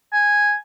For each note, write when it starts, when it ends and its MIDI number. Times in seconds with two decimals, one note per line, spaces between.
0.13 0.54 80